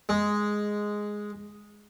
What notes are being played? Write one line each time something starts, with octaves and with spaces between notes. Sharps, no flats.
G#3